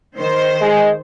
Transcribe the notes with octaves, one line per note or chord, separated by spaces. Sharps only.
D#3 C5
G#3